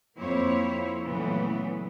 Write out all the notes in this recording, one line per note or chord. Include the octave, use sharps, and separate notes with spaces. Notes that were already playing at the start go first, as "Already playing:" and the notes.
F2 A#3 E4 C5 C#5
A#2 C#3 E3 F#3 A3 B3